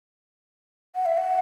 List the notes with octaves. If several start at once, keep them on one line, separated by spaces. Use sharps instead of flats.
F#5
E5
F#5